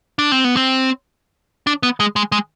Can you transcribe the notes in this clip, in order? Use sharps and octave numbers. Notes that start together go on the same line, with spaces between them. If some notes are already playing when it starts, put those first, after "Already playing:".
D4
C4
B3
C4
D4
B3
G#3
G#3
G#3